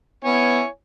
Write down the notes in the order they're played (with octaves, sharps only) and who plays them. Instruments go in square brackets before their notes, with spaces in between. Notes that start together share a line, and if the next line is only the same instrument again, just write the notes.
[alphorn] B3 [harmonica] E4 C#5 G#5